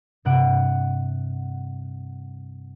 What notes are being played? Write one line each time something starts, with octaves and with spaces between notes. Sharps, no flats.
G2 C3 F#5 D7